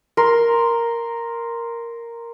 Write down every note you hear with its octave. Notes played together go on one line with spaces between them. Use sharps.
A#4 C6